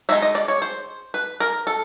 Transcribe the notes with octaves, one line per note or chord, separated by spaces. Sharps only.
G#3 C4 D#4 E5
D#5
D5
C#5
C5
B4
A#4
A4